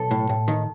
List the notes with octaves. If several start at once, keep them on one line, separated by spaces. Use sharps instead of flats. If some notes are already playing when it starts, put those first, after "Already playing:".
Already playing: B1 A4
A2
A2
D#3